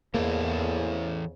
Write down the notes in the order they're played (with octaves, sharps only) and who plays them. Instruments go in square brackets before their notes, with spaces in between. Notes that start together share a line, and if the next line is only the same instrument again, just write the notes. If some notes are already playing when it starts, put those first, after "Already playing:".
[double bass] E2 [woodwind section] G#2 C#3 [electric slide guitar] E3 E4 A4 [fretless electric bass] A#3